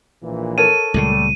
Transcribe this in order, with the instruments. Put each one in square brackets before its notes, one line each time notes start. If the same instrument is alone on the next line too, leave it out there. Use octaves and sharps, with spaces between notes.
[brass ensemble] A#1 A#2 E3
[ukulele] A4 A#4 C#5 [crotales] D#7
[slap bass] C#2 A#2 C#3 [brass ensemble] G3 A3